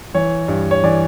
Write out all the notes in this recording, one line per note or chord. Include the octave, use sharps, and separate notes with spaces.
E3 C#5
G2
C#5
E3 D5